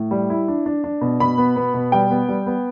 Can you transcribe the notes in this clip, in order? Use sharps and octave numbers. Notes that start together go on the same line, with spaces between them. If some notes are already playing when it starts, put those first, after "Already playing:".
Already playing: A2
G3
E4
D4
D4
D4
B2
B2 B5
B3
B3
B2
G3 G5
B3
G3
B3